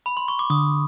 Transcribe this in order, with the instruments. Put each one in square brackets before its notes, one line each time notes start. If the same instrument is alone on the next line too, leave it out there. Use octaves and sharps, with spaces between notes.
[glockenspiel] B5
C6
C#6
D6
[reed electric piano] D3 [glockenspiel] D#6